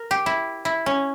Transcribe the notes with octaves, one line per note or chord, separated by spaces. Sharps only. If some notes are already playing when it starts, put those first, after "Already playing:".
Already playing: A#4
G4
E4
E4
C#4